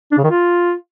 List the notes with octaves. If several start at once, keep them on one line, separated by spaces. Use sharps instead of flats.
D4
C#3
D#3
F4